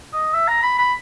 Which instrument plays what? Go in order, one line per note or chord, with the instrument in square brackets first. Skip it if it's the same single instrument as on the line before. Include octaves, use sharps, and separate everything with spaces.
[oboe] D#5
E5
A#5
B5
B5